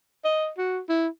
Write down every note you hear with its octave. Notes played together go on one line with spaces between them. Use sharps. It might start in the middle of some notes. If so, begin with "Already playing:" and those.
D#5
F#4
E4